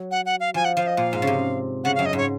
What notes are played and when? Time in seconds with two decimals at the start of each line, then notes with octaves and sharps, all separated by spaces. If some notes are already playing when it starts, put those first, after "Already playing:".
Already playing: F#3
0.11 F#5
0.26 F#5
0.40 F5
0.54 F3 G#5
0.65 F#5
0.76 F3 F5
0.87 D#5
0.97 A#2 F5
1.13 G#2
1.22 C#3
1.27 C3
1.84 C#3 F#5
1.95 F5
1.99 F#2
2.06 D#5
2.13 G#2 C#5